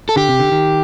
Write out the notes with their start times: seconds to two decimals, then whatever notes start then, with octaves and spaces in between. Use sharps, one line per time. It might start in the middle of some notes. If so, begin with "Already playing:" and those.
0.09 A4
0.16 D3 G4
0.29 C3
0.39 D3
0.52 D#3